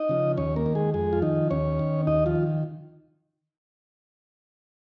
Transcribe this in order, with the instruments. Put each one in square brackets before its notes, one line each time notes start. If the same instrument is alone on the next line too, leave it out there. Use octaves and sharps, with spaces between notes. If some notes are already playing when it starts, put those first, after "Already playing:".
Already playing: [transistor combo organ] D#4 D#5
C#3 F3
D#2 C#4 C#5
A#3 A#4
D#3
G#3 G#4
F2 G#3 G#4
F4
D#3 F3 D#4
D#2 C#4 C#5
D#3
D#2 D#4 D#5
F3 F4
D#3